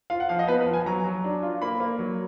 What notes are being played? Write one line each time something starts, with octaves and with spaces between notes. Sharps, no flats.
F4 F5
F#5
F3 F5
D#5
B3 B4
B4
F3
G#5
F#3 A#5
F#3
D4
F4
A#3 B5
A#3
F#3